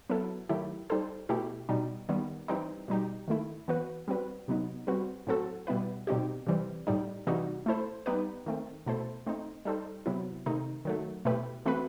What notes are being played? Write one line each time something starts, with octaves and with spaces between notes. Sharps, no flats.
F#3 B3 E4 A4
D#3 F#3 A3 E4 G4
G3 D#4 A4 C5
B2 A3 E4 G4
B2 G3 D#4
D#3 G3 B3
E3 G3 C4 D#4
B2 G3 D#4 G4
D#3 A3 E4
E3 B3 F#4 B4
G3 C4 F#4 B4
C3 F#3 B3 D#4
G3 C4 F#4 B4
A2 F#3 C4 F#4 A4
B2 G3 B3 E4 B4
B2 G3 C4 D#4 G4
C3 E3 G3 C4
A2 G3 D#4
C3 E3 G3 D#4 F#4
A3 E4 A4 C5
G3 B3 D#4 G4 B4
D#3 A3 C4
B2 A3 E4 A4 C5
A3 C4 D#4
G3 D#4 A4 C5
C3 F#3 B3 E4
C3 D#3 A3 D#4
D#3 F#3 A3
B2 A3 E4 G4 B4
E3 A3 C4 F#4 B4